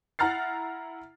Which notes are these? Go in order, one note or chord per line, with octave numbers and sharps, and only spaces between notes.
E4 F#5 A#5 F6 A6 C7